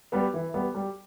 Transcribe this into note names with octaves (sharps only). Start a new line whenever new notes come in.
G3 B3
E3
G3 B3
G3